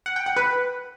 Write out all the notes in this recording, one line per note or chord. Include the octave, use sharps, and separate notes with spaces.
F#5
G5
F#5
B4